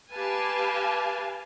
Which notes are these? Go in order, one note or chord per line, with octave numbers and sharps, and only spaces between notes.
G4 B4 F5 G#5 A5